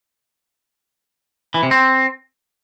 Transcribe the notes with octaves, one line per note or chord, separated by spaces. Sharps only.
E3
C3
C4